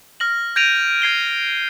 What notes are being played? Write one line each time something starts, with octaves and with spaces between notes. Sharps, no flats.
F6 A#6 F#7
G6 G#6 A#6 D7 D#7 F7
G#6 C7 G7